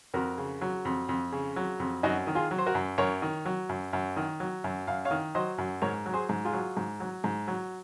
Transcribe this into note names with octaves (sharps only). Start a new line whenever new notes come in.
F2 F#4 A#4
C#3
F#3
F2
F2
C#3
F#3
F2
F#2 D#4 F#4
D#3
F4 G#4
F#3
C5
F#4 A#4
F#2
F#2 A#4 C#5
D#3
F#3
F#2
F#2
D#3
F#3
F#2
F#2 F5
C#5 F5
D#3
F#3 C5 D#5
F#2
G#2 A#4 C#5
F#3
G#4 C5
G#2
F4 G#4
F#3
G#2
F#3
G#2
F#3